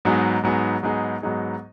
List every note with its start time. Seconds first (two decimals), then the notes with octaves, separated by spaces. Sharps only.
0.05 G#2 F#3 B3 D#4 G#4
0.43 G#2 F#3 B3 D#4 G#4
0.83 G#2 F#3 B3 D#4 G#4
1.22 G#2 F#3 B3 D#4 G#4